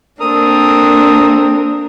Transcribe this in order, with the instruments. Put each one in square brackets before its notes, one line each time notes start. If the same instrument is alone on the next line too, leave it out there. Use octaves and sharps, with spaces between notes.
[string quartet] A#3 D4 [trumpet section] C4 A4 [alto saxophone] A#4 [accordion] D#6